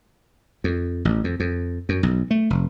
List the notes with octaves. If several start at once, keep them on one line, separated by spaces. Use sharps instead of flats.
F2
A1
F2
F2
F#2
B1
A3
F1